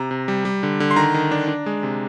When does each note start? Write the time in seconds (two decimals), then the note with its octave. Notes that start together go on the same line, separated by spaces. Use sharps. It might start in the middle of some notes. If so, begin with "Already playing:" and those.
Already playing: C3 A#5
0.11 C3
0.28 G3
0.45 G3
0.63 D3
0.80 D3
0.91 C6
0.96 D#3 A#5
1.14 D#3
1.31 D4
1.48 D4
1.66 G#3
1.83 C3